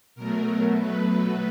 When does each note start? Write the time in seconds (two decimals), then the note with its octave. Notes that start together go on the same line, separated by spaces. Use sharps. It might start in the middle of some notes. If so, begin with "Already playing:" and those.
0.15 B2 F#3 A3 A#4
0.77 B4